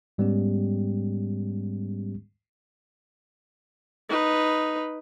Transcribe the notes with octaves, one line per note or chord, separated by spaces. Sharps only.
G#2 G3 G#3 B3 C#4 G4
D#4 B4